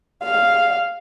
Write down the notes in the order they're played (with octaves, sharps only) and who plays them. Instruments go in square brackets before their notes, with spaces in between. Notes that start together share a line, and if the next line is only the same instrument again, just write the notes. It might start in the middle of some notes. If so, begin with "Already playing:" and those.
[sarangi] F5